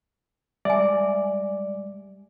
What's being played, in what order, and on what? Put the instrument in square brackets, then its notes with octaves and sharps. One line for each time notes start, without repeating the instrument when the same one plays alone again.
[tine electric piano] G3 G#3 [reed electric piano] D5 [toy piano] E5 G#5